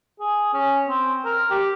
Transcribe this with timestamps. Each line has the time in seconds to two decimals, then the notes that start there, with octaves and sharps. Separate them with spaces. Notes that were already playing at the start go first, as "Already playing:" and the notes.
0.20 G#4
0.54 C#4
0.89 C4
1.25 A#4
1.50 G4